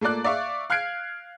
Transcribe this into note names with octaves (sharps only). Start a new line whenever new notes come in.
A3 A#3 F4 D5 F#6
D5 E5 F5 C#6
F5 F6 F#6 G#6 C7 D7